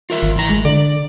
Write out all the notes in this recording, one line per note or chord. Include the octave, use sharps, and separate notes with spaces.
F4 A#4 E5
G#1
D#3 E3 A#5
G#3
D3 D5